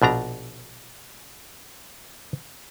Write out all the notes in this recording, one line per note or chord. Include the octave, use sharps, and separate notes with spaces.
A#1 B2 D4 A#5